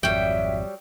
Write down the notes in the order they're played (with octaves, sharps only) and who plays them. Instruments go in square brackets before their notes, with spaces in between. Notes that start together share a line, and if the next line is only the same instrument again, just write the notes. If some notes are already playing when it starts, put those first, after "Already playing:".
[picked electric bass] G#1 F2 [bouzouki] F#3 G3 [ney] E5 [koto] G5